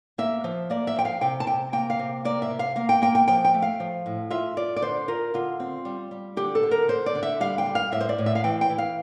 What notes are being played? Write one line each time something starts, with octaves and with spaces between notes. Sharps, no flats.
A#3 E5
F3
A#3 D5
E5
F3 G5
F5
C3 G5
A5
C3 G5
A#3 G5
F5
C3
A#3 D5
E5
C3
F5
A#3 F5
G5
A#3 G5
G5
F3 G5
G5
A3
F5
F3
A2
F4 E5
F4 D5
D5
D3 C5
F4 A#4
D3 F4
C4
G3
G3
D3 G4
A4
D3
A#4
D3 C5
D5
D3
E5
G3 F5
G5
G3
F5
A2 E5
C5
D5
A2
E5
F5
E3 G5
G5
E3
F5